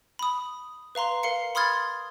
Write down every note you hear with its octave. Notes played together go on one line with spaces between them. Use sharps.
B5 D#6
B4 F5 A#5 C6
A#4 F5 C7 C#7
B5 C6 D#6 F6 G#6 A6
C6